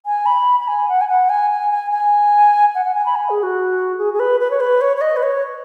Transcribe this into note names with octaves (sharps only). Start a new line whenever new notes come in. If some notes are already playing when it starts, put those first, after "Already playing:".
G#5
B5
B5
G#5
F#5
G#5
F#5
G#5
G#5
G#5
G#5
F#5
F#5
G#5
B5
G#5
G#4
F#4
G#4
G#4
B4
B4
C#5
B4
C#5
C#5
D#5
B4
C#5